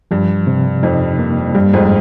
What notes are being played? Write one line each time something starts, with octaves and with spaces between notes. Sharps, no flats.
G2 F3
C3
F2 D#4
A#3
G2 G3
F2 G#2